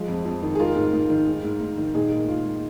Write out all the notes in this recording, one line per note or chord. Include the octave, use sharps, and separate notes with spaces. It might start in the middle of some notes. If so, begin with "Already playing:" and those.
Already playing: F3 G#3
F2
F2
D#3
G#4
G#3 F4 A#4
G#2
G#2
D#3
G#3
G#2
G#2
D#3
A#2 D#4 G#4
G#3
A#2 F4
G#3